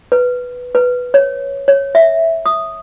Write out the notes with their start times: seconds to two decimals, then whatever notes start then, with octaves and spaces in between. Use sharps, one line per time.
0.12 B4
0.75 B4
1.14 C#5
1.68 C#5
1.95 E5
2.46 D#6